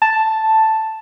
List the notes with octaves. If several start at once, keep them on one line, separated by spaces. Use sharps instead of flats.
A5